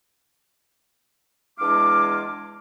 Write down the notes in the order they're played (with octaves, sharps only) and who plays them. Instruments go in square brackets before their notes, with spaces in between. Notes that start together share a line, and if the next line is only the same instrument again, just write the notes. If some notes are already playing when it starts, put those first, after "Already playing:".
[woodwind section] E2 G#3 D4 F4 F5 D6